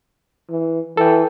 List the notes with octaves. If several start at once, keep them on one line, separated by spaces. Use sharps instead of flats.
E3
E3 A4 G5